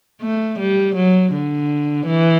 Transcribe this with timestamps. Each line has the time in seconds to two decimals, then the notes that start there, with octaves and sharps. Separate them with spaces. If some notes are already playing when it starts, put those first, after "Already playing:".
0.22 A3
0.59 G3
0.95 F#3
1.33 D3
2.06 E3